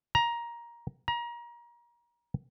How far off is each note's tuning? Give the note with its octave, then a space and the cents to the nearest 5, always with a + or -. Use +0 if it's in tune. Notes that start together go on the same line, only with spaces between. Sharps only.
A#5 +15
A#5 +30